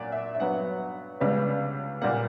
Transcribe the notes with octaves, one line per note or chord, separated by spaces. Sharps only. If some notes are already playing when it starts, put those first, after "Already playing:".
Already playing: A#2 F#3 A#3 D5
E5
E5
G2 F#3 B3 F#5
C#2 C#3 G3 B3
A#2 G3 A#3 F#5